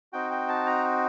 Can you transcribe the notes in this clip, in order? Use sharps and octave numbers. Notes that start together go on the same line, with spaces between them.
C4 D#4 F#4 G5
G5
A5
A#5